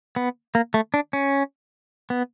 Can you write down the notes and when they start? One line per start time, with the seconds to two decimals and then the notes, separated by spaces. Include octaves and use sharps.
0.16 B3
0.55 A#3
0.74 A3
0.94 D4
1.13 C#4
2.10 B3